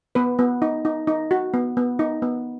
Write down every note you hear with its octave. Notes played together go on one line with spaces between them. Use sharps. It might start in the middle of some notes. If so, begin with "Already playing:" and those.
B3 B4
B3
D#4
D#4
D#4
F#4
B3
B3
D#4
B3